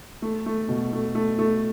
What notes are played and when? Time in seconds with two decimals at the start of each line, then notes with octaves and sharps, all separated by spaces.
0.22 A3
0.46 A3
0.68 B2
0.93 A3
1.15 A3
1.39 A3